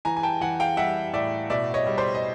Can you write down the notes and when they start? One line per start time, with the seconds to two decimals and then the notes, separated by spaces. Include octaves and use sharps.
0.05 E3 G#5 A#5
0.17 G#5
0.23 G5 A5
0.41 E3 F#5 G#5
0.60 F5 G5
0.77 G3 E5 F#5
1.13 A2 D5 E5
1.50 B2 D5 E5
1.74 C#5 D#5
1.86 G3
1.98 C5 D5
2.15 D#5